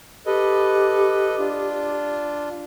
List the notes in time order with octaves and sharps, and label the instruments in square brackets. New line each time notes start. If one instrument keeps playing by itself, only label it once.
[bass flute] G4 [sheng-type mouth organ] A4 B4 D#5
[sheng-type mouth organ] D4 F4